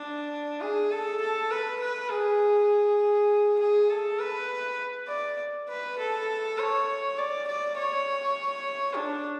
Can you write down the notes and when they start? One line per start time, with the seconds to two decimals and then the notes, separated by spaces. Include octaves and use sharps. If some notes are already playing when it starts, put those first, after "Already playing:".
Already playing: D4
0.61 G#4
0.91 A4
1.21 A4
1.50 B4
1.81 B4
2.10 G#4
3.60 G#4
3.90 A4
4.19 B4
5.08 D5
5.69 B4
5.98 A4
6.58 C#5
7.18 D5
7.48 D5
7.77 C#5
8.96 D4